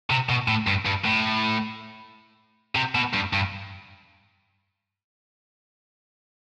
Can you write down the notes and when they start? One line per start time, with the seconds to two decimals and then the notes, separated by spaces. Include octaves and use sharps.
0.10 C3
0.29 B2
0.48 A2
0.67 G2
0.86 G2
1.05 A2
2.75 C3
2.95 B2
3.14 G2
3.33 G2